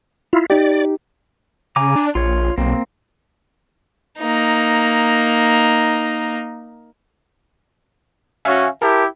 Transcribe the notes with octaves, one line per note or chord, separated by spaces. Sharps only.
E4 F4
D#4 G4 D5
C#3 G#5 A#5 D6
D4
A#1 F4 C#5
B1 A#3 C4
A#3 D#4
C#4 F#4 E5 F5 G#5
E4 G4 A#4 A5